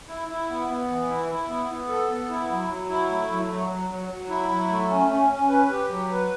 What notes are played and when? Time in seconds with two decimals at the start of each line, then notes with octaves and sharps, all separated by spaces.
0.08 E4
0.29 E4
0.49 B3
0.68 B3
0.89 E3
1.09 E4
1.29 E4
1.48 B3
1.68 B3
1.88 A4
2.09 B3
2.29 E4
2.49 F#3
2.68 F#3
2.89 E4
3.09 A3
3.29 F#3
3.49 F#3
3.69 F#3
3.90 F#3
4.09 F#3
4.29 E4
4.49 F#3
4.69 A3
4.90 C#4
5.09 C#4
5.30 C#4
5.49 B4
5.69 G4
5.89 F#3
6.10 B4